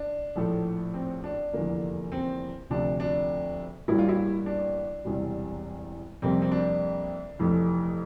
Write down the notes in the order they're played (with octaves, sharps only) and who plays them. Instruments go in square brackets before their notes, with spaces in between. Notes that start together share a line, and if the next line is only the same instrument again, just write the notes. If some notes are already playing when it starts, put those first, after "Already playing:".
Already playing: [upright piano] D4
A#1 A2 F3 A3
C4
D4
F1 E2 D3 F3 A#3
C4
D2 C3 F3 D4
D4
A1 G2 E3 G3 A#3 E4
F4
E4
D4
E1 E2 C3 G3
F2 C3 G3 A#3 C4
C4
D4
F1 F2 E3 A3